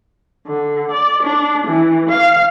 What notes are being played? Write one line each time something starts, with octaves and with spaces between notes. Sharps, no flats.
D3
D5
D4
E3
F5